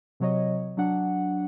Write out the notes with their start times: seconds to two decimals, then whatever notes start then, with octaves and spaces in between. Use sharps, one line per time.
0.20 C3 F#3 C#5 D#5
0.77 F#3 D4 F#5